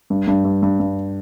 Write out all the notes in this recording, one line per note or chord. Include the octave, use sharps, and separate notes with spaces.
G2
G2
G2
G2
G2